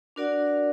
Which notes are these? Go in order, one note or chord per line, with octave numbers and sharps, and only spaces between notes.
D4 F#4 A#4 D5 F#5